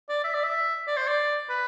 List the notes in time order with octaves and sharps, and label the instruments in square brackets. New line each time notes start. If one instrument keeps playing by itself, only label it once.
[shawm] D5
E5
D5
E5
D5
C5
D5
B4